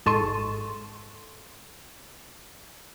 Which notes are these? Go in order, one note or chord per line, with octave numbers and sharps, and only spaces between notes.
G#1 G#2 A4 C6 C#6 D#7